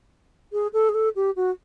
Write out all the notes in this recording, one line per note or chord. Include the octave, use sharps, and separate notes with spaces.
G#4
A4
G#4
A4
G4
F#4